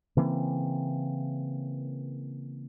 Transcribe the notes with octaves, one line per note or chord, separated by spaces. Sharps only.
C#3 E3 A#3 C4